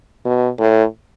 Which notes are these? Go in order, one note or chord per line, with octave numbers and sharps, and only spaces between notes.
B2
A2